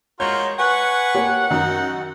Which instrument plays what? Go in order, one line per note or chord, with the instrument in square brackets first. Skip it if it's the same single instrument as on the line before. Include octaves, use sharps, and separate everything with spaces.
[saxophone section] G#3 C#5 [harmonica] F4 F#4 A#4 [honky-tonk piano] G6
[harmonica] B4 G#5 C#6 [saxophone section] F#5
[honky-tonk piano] A#3 G4 C#5
[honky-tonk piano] F#2 D#3 [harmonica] D#4